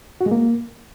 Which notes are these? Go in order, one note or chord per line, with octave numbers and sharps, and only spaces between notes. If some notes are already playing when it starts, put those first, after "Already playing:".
F#4
G#3
A#3